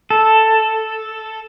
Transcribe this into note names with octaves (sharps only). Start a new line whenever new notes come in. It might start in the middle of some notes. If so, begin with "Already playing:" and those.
A4